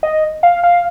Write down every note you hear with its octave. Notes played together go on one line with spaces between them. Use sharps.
D#5
F5
F5